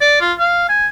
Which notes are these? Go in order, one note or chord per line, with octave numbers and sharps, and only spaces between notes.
D5
F4
F5
G#5